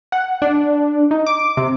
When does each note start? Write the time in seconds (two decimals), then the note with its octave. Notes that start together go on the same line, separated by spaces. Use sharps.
0.12 F#5
0.42 D4
1.11 D#4
1.27 D6
1.57 C3